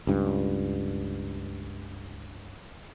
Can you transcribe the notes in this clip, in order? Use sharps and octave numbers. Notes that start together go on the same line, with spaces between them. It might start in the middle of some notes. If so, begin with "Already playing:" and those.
C#2 G2